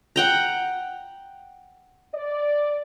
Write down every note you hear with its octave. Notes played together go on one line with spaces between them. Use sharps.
F#5 G5 A#5
D5